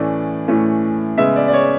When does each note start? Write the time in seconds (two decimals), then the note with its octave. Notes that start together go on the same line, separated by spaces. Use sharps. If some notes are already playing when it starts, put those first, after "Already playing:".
Already playing: A2 E3 A3 C#4 D5
0.48 A2 E3 A3 C#4
1.18 C#3 G#3 B3 E5
1.36 D5
1.48 D5
1.53 C#5